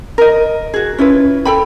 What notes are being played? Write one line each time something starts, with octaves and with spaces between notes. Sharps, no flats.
A#4 D#5
F#4 G#4
C#4 E4 F4 B4
A4 G5 B5